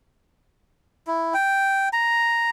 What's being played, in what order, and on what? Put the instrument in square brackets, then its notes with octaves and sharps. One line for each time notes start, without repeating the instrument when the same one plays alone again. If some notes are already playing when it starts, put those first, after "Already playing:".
[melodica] E4
G5
A#5